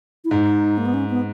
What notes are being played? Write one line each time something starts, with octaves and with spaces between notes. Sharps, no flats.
E4
G#2 D#4
A#3
B3
C#4
B3